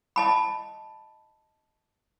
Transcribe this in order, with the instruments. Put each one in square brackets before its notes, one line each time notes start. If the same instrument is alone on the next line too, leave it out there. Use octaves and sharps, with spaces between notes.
[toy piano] D#5 A5 B5